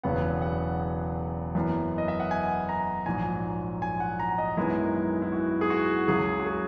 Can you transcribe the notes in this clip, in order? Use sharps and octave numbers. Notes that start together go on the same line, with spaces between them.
E1 E2 C#3 F#3 B3 F#5
F#5
F#2 E3 B3
D#5
E5
F#5
G#5
A#5
A#1 G#2 F#3 G#5
G#5
F#5
A#5
D#5
F#2 D#3 G#3 B3 E4
E4
F#4
G#4
F#4
C#2 C#3 F#3 G#4
F#4
G#4